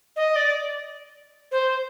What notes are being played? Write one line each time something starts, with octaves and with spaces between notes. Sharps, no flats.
D#5
D5
C5